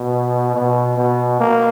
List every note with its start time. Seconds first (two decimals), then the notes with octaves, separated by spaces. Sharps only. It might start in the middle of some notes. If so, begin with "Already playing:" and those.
Already playing: B2
0.55 B2
0.97 B2
1.40 A#3